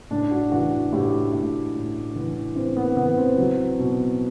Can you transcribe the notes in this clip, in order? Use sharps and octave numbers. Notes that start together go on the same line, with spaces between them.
A2 D4
F#4
E3 F#4
F#4
A2 G4
A2
A2
E3
E3 C4
B3
E3 B3
C4
F#3
B2